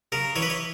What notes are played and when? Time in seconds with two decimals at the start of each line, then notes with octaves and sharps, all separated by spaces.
0.12 C#3 A#4
0.36 E3 C#5
0.42 B4
0.50 C#5